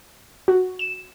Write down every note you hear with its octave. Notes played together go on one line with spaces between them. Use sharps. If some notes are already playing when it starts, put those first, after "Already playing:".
F#4
E7